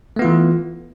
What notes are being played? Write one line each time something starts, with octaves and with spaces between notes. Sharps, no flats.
E3 A3 B3 F4